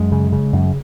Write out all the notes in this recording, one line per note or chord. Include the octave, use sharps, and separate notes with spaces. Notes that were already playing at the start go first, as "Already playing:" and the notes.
Already playing: F#2 G#3
C#3
C#3
F#2